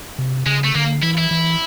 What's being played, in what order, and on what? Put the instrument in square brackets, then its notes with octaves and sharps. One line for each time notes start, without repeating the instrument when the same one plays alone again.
[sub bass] C3
[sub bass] C#3 [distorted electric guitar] G#3
[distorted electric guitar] A3
[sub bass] D3 [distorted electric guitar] A#3
[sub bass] E3 [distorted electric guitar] E4
[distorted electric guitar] E4
[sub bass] E3